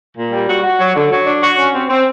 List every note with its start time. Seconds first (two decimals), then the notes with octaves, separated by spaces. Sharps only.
0.16 A#2
0.32 G3
0.48 F#4
0.64 F#4
0.79 F#3
0.95 D3
1.11 F#3
1.26 D4
1.42 F#4
1.58 C#4
1.74 C4
1.89 C4